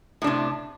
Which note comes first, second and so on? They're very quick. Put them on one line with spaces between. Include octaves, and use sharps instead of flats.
A2 D4 C3